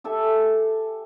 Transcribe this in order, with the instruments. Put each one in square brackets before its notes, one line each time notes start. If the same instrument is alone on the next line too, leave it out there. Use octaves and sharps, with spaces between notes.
[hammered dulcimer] G4 A4 E5 G#5